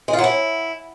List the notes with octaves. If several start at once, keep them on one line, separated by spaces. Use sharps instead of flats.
G#3
F4
F#3
E4